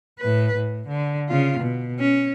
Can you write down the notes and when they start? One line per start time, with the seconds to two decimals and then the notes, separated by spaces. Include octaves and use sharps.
0.19 A2 B4
0.56 A2
0.88 D3
1.28 C#3 F4
1.60 B2
1.99 C#4